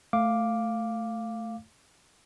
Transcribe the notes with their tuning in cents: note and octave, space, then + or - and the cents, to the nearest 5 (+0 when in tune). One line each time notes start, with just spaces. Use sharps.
A3 +0 F5 +0 D6 +0